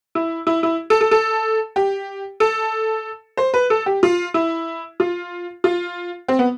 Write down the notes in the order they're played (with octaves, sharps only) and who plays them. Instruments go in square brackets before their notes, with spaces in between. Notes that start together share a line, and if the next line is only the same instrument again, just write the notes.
[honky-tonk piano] E4
E4
E4
A4
A4
A4
G4
A4
C5
B4
A4
G4
F4
E4
F4
F4
C4
B3